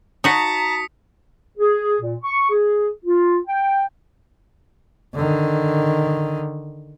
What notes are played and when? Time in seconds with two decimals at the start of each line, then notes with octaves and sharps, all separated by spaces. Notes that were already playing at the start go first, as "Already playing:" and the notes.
0.24 D#4 F#4 A5 A#5 D#6 B6 C#7
1.58 G#4
2.01 A#2
2.24 C#6
2.50 G#4
3.05 F4
3.47 G5
5.14 D3 D#3